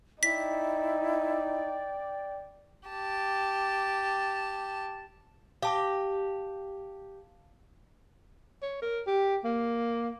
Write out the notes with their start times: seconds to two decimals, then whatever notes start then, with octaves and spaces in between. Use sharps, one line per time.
0.23 D#4 E4 D5 G5 B6
2.89 G4 A5
5.63 G4 F5 A5 D6
8.62 C#5
8.82 A#4
9.07 G4
9.44 A#3